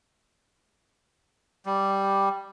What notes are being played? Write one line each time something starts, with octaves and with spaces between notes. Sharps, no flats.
G3